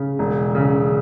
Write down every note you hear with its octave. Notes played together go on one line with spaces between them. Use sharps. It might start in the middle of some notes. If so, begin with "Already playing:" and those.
Already playing: C#3
E1
C#3